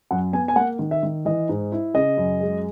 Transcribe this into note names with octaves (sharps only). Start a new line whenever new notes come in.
F#2 F#5
B3 G#5
G#5
A#3 F#5
D#3
E5
D#3
E3 D#5
G#2
E4
C#3 D#5
F#2
G#3